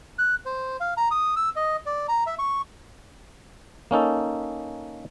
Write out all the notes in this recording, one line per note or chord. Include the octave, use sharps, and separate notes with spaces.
F#6
C5
F5
A#5
D#6
E6
D#5
D5
A#5
E5
C#6
A#3 C#4 D#4 A4